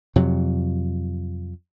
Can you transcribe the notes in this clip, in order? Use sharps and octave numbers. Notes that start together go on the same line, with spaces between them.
F2 C3 F#3